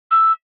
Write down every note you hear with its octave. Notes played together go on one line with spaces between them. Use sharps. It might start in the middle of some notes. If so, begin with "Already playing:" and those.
E6